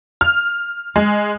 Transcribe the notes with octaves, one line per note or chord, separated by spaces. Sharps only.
F6
G#3